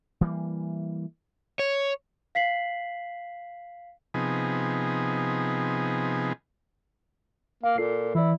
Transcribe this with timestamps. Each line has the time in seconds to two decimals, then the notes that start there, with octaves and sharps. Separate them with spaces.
0.21 E3 G3 A#3
1.59 C#5
2.35 F5 B6 C7 F#7
4.14 C3 F3 B3 D#4 G#4
7.64 A#3 F5
7.78 A#2 F4 A4 C7
8.15 E3 E4 D5